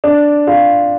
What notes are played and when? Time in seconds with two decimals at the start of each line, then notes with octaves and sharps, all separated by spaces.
0.04 D4
0.47 F4